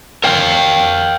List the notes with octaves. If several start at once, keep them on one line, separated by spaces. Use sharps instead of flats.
A#4 F5 G5